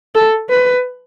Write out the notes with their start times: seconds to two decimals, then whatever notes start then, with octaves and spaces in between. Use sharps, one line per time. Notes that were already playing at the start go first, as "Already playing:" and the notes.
0.15 A4
0.50 B4